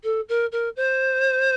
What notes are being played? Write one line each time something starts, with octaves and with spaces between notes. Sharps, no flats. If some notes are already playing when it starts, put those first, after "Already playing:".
A4
A#4
A#4
C5